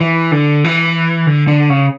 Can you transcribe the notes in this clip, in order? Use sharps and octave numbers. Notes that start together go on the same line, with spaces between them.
E3
D3
E3
D3
D3
C#3